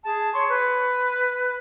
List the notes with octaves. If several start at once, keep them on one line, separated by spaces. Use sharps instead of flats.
G#4 A5
C#5 C6 C#6
B4